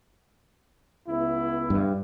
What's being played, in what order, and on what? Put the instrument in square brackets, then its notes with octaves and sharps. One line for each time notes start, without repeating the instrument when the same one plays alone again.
[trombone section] C#2 B3 E4
[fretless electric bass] G2